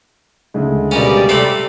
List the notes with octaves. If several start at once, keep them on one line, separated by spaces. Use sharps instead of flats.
D2 C#3 G#3
B2 G3 A#3 C#4 D5
C3 A3 A4 C7 F#7